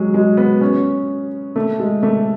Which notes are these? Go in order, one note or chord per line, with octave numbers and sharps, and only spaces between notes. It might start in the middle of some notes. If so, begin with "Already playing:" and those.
Already playing: F#3 G#3
G#3
B3
C#4
A3
G#3
A3